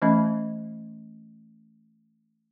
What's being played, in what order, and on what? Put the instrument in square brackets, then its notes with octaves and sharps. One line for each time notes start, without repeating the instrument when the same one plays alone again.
[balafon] E3 A3 C#4 D#5 B5